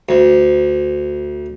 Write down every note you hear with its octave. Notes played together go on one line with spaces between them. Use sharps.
D2